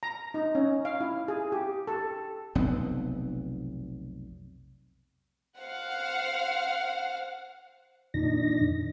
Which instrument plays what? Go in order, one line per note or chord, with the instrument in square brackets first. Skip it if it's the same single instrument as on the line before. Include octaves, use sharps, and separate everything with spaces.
[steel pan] A#5
D#4
C#4
F5
E4
G#4
G4
A4
[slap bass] F1 B1 B3 C4
[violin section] C5 F5 F#5
[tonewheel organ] F2 A#2 D#3 D4 D#4 A#6